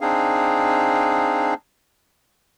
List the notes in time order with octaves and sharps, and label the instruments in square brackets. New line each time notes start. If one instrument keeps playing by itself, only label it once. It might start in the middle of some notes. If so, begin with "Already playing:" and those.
[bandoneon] C4 D4 D#4 G#4 F5